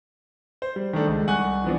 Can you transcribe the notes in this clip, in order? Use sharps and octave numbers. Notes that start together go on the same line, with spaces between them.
C5
G3
D#3 A3 D4 A4
C#2
C2 F#5 G#5 C#6 F#6
E3 F3 B3 C4 D4